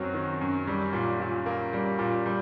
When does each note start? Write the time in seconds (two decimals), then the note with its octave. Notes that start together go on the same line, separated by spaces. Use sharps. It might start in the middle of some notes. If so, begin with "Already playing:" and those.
Already playing: F#2 D#3 F#3 C4
0.14 D#3
0.41 F#2
0.67 G3
0.93 A#2
1.20 A#2
1.46 A#3
1.73 G3
1.99 A#2
2.26 G3